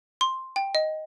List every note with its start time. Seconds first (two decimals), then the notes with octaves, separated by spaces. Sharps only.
0.21 C6
0.56 G5
0.75 D#5